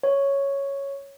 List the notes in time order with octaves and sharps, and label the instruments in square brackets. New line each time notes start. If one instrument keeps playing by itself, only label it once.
[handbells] C#5